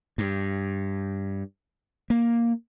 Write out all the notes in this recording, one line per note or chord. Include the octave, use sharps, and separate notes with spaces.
G2
A#3